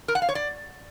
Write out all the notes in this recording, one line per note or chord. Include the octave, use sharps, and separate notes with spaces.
A#4
F#5
F5
C#5
D5